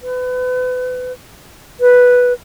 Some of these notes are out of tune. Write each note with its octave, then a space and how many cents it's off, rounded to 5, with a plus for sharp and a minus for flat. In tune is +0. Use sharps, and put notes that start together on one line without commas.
B4 +30
B4 -5